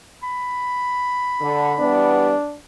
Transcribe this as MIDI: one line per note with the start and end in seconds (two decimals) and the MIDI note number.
0.23 2.10 83
1.40 1.73 50
1.79 2.34 40
1.79 2.34 55
1.79 2.34 59
1.79 2.57 62